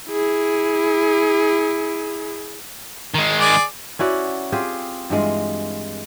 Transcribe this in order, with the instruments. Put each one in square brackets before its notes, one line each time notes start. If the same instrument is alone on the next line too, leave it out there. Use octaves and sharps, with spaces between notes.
[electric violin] E4 G#4
[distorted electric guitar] D#3 G#3
[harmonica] G#4 D5
[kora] C#4 E4 F#4 D5
C4 F4 G4 G#4
G2 E3 G#3 F4